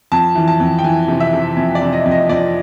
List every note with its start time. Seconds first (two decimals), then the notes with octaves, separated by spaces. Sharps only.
0.12 F2 A5
0.35 E3
0.48 A5
0.60 F2
0.79 G5
0.84 E3 G#5
1.08 C3
1.20 E5
1.33 C3
1.57 F2
1.75 D5
1.81 C3
1.93 D#5
2.05 F2
2.11 D#5
2.29 F2 D5